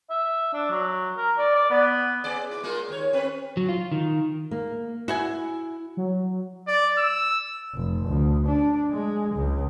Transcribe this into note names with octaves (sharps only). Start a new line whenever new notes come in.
E5
D4
F#3
A#4
D5
D5
B3
B3 G#4 D5
E4
G#3 A#3 F4
D#2 C#5
C4 B4
F#3
F4
D#3
A#3
E4 F#4 F#5 G#5
F#3
D5
E6
F1
D2
D4
G#3
C#2